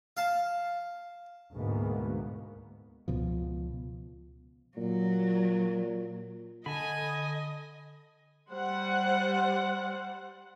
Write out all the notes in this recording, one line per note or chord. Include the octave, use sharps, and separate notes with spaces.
F5 A5
D2 G#2 B2 A#3 B3
C#2 B2 F3
A#2 F#3
D3 D#5 G#5 A5 B5
G3 C5 F#5